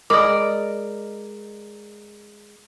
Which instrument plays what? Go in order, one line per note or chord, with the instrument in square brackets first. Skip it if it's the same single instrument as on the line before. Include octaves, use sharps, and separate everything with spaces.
[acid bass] G#3 [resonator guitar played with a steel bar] A#4 D5 [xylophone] D#5 B5 [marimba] D6 D#6